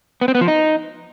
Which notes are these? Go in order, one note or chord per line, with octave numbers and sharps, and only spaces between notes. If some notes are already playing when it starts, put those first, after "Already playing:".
B3
C4
B3
F3
D#4